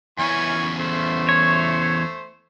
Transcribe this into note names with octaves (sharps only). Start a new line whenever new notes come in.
E2 E3 C#4 G#5 C#6
A3 C5
C#5